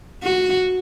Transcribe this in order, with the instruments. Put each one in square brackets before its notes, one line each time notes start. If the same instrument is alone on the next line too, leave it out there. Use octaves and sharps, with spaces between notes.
[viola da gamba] F#4